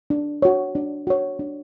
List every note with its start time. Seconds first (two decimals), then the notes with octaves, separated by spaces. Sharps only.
0.10 D4
0.42 F#4 C#5
0.75 D4
1.07 F#4 C#5
1.39 D4